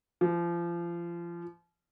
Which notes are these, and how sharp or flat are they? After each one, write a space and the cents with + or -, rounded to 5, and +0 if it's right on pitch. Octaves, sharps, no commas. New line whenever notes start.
F3 -30